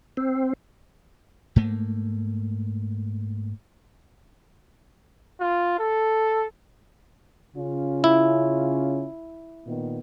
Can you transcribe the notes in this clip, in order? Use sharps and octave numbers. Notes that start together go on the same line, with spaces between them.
C4
G#2 A3 A#3
F4
A4
C#3 C#4 F4
E4
A#2 D#3 B3